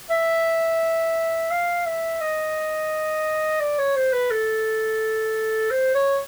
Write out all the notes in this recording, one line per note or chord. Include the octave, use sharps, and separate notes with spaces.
E5
F5
E5
D#5
D5
C#5
C5
B4
A4
C5
C#5